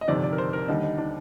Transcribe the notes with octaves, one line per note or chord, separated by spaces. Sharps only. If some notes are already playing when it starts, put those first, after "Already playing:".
D#5
G1 F2 C3 D#3 D5
D5
A#4
C5
A#4
D#2 D3 G3 D#4
D#4
D4